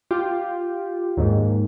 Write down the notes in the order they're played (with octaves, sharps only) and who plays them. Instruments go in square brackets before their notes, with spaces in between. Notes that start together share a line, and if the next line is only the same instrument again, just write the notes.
[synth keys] F4 G4
D#2 G#2